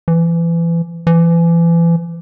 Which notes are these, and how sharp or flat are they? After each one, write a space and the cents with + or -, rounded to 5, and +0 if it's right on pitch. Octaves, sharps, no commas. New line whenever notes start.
E3 +30
E3 +35